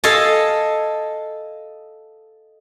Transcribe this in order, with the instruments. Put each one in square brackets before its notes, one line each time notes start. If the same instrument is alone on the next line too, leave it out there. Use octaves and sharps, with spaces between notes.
[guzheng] A4 D#5 F5 G#5 A5